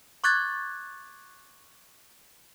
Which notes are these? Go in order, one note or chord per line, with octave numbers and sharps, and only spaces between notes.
C#6 D6 F#6 G#6 A6